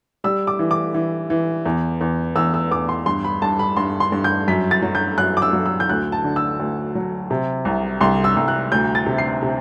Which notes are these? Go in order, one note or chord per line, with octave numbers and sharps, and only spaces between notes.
G3 E6
D6
E3
D6
E3
E3
E2
E2
E2 E6
E6
E2 D6
C6
G2 C6
B5
G2 A5
B5
G2 C6
C6
G2
G6
F#2 B6
A6
F#3
G6
F#2 F#6
D6
E6
F#3
E6
G6
D2 F#6
A5
D3
E6
D2
F#3
C3
C2
C2 C6
E6
C2
F#6
D2 G6
A6
C3
C7
C3